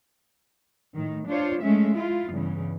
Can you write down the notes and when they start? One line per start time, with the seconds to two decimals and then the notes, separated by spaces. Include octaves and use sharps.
0.95 A2 D#3
1.28 D4 F4 C5 C#5
1.63 G#3 A3 C#4 E5
1.96 E4 F4
2.29 E2 G2 C#3 E3